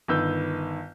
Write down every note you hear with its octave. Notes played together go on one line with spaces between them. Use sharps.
G1 D#3 B4 E6 G6